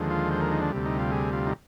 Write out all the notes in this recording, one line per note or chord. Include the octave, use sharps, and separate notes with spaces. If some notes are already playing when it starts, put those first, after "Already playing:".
Already playing: D#2 D3 F3 G#3
F4
C5
A#4
D#4
D4
D2 C3 G3
D#4
F4
G#4
F4
D#4